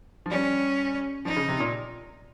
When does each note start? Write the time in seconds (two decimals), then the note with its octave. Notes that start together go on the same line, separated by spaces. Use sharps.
0.26 F3
0.31 G3 C#4
1.25 F3 D#4
1.36 C#3
1.48 C3
1.60 A#2